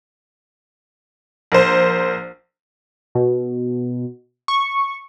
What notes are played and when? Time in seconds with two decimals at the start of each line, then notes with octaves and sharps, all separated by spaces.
1.52 A#1 A#4 C5
3.15 B2
4.48 C#6